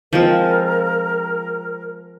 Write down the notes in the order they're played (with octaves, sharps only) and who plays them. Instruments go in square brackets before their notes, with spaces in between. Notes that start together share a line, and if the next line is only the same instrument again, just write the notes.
[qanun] F3 G#3 C4 [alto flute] A#4